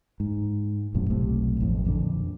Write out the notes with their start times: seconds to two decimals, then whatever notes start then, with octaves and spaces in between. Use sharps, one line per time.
0.20 G#2
0.94 E1 F#2 A2 C3
1.10 B1 A2 C3
1.61 A1 F2
1.85 A#1 F2 D3